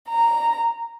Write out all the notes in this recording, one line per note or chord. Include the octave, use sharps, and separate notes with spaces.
A#5